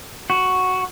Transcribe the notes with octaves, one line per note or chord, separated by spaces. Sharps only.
F#4